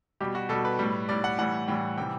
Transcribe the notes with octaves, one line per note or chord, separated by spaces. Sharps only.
B2 G3 G4
F#4
B2 G3 A4
B4
A2 G3
A2 G3 D5
F#5
A2 E3 G3 F#5
A2 E3 G3 G5
C3 E3 G3 G5